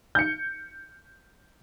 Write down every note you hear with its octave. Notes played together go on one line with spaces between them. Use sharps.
G6 C#7